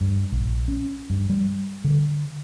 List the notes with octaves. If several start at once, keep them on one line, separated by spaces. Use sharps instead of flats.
G2
A#1
C#4
G2
G3
D3